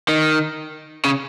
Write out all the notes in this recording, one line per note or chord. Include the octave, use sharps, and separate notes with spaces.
D#3
C#3